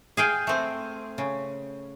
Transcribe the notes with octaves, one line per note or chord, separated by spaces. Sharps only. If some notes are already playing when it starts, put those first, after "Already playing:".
G#4 F5 G5
A3 C4
C#3